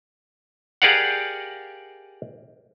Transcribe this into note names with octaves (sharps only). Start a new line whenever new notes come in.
G4 G#4 A#4 D5 F5 F#5